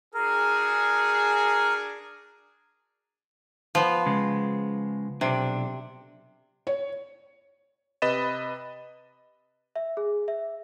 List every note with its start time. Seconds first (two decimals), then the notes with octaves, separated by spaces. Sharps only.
0.14 D4 F#4 G#4 A#4
3.75 F3 B3
4.06 C#3 G#3
5.21 B1 C3 D4
6.67 C#5
8.02 C3 B4 D#5 B5 A6 E7
9.76 E5
9.97 G#4
10.28 E5